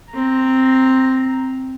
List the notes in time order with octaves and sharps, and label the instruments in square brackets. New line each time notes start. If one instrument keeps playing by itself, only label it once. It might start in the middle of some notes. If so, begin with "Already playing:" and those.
[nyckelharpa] C4 A#5